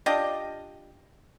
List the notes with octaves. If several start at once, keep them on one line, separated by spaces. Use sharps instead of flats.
D4 F4 G4 D#5